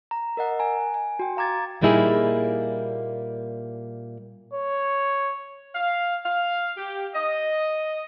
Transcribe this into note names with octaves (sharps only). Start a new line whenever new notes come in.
A#5
A#4 D#5 F#5
G#5 A#5
G#5
F#4 G5
F5 A#5 D6 G#6 A6
A#2 G3 A#3 D#4 E4 G#4
C#5
F5
F5
G4
D#5